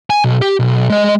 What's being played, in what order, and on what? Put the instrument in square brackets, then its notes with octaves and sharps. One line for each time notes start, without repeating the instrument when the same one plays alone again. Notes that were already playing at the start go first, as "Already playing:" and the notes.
[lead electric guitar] G#5
B1
G4
B1
G#3 D#5